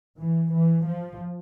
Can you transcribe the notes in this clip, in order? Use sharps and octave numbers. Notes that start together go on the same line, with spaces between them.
E3
E3
F3